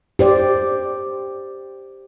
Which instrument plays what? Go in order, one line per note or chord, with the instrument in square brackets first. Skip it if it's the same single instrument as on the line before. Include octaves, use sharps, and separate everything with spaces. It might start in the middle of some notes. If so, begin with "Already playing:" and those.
[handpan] G4 C5 D5